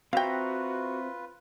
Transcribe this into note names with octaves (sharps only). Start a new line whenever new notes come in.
C4 F4 F#4 B4 E5 F5 G5 A#5